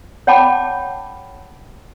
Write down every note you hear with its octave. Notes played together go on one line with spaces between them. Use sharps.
C#5 F#5 G5 A5 B5 D6